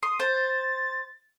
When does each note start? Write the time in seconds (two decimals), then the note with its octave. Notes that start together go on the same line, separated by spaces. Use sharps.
0.03 C6 D#6
0.20 C5 A6